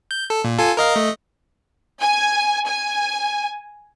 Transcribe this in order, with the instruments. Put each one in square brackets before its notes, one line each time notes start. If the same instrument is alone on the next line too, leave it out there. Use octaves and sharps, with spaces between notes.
[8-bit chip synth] G6
A4
A#2
F4 A4 G#5
A#4 D#5 F5
A3 D#5
[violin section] G#5
G#5